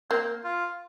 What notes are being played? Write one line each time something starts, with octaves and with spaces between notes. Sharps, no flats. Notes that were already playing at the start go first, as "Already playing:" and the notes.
A#3 C4
F4